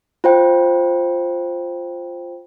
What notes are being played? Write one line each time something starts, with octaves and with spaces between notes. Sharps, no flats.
F4 C5 G5